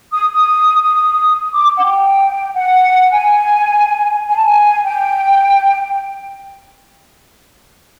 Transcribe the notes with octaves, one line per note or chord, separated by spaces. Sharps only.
D#6
D#6
D#6
D6
F#5
G5
F#5
G#5
G#5
A5
G#5
G5